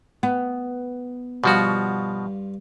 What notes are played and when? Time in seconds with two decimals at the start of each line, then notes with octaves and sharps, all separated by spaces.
0.23 B3
1.44 G2 B2 F3 F4 F#4